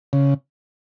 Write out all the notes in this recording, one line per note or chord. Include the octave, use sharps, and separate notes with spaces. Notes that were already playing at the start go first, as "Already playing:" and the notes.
C#3